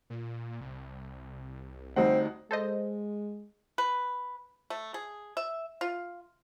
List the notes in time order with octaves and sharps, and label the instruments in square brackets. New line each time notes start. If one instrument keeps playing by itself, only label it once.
[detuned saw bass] A#2
C2
[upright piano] D2 D#4 F#5 [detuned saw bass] G3 [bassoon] C4
[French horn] G#3 [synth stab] A4 C5 D#5
[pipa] B4
A3
G#4
E5
F4